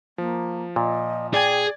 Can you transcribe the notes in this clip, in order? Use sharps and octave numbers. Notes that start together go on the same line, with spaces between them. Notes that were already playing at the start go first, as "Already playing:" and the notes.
F3 A#3
A#2 D#5
G#4 D5 G5 G#6